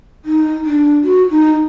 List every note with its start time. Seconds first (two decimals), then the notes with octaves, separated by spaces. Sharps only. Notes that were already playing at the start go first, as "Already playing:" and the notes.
0.25 D#4
0.64 D4
1.03 F#4
1.30 D#4